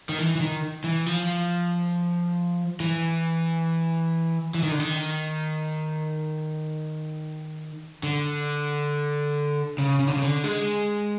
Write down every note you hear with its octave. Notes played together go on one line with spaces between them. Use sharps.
D#3
E3
E3
D#3
E3
F3
E3
E3
D#3
D3
D#3
D3
C#3
C#3
D3
C#3
D3
G#3